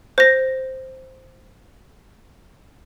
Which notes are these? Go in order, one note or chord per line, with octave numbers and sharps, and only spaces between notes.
C5 A#6